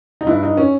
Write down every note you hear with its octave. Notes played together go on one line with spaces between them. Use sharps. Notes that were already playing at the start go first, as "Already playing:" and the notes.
D#4
G2 E4
D#4
C#4